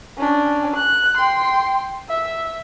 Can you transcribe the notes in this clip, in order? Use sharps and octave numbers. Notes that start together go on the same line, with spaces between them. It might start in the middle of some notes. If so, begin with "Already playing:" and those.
C#4 D4
F#6
G5 C6
E5